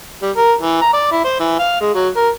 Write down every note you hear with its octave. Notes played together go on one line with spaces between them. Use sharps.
G3
A#4
E3
A#5
D5
E4
C5
E3
F5
G#3
F#3
A#4